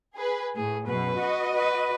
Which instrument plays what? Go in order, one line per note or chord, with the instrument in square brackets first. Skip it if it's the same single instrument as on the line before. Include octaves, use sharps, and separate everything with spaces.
[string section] G#4 B4
[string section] A2 [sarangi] G#4
[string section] F#2 B2 [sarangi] B4
[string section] F#4 D#5
[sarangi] B4